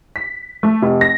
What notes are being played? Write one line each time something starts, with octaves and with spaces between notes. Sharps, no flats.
B6
A3
F1
A#6